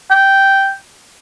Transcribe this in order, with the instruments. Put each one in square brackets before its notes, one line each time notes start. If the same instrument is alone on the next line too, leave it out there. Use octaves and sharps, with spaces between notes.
[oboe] G5